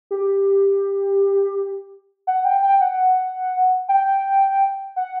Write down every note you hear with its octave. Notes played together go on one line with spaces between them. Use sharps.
G4
F#5
G5
G5
F#5
G5
F#5